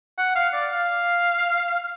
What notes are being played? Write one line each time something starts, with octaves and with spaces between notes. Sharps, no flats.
F#5
F5
D5
F5